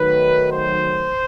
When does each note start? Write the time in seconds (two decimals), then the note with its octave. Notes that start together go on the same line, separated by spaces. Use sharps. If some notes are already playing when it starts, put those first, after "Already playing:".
Already playing: D#3 F#3 A3 B4
0.52 C5